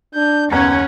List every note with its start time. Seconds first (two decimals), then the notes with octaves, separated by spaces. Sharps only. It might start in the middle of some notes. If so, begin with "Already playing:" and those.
0.15 D4 G6
0.52 F#1 D#2 B3 C#4 F#5 A#5